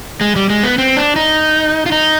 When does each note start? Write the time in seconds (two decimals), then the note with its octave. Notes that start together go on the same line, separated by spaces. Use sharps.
0.21 G#3
0.36 G3
0.50 G#3
0.63 B3
0.78 C4
0.97 D4
1.16 D#4
1.86 F4
1.92 D#4